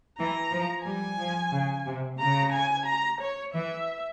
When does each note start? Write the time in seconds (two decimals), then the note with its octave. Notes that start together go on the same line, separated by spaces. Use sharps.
0.18 E3 A#5
0.51 F3
0.85 G3 G#5
1.19 F3
1.52 C#3
1.85 C3
2.19 C#3 A#5
2.52 G#5
2.86 A#5
3.21 C#5
3.54 E3 E5